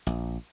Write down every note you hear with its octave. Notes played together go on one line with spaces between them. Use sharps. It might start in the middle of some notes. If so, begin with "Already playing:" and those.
A#1